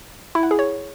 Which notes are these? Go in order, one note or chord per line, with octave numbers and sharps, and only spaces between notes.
E4
F#5
G#4
C#5